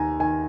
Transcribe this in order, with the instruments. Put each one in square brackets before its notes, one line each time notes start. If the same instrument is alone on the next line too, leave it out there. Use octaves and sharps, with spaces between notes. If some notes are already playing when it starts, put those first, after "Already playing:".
Already playing: [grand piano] D#2 D#3 G#5 A#5
D#3 G#5